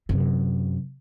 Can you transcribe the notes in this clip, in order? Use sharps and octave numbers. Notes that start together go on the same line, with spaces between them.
F#2 C3